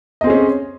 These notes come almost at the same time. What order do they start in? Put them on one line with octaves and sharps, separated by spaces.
D#5 C4 G#4 C#4